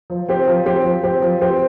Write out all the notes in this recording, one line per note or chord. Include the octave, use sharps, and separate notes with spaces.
F3
C4 G4 C5
F3
C4 G4 C5
F3
C4 G4 C5
F3
C4 G4 C5